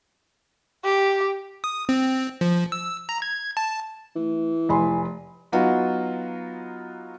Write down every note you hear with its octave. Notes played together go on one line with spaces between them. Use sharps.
G4
D#6
C4
F3
E6
A#5
G#6
A5
E3 A3
F1 G#5 B5 C6
F#3 B3 D#4 F4 F#4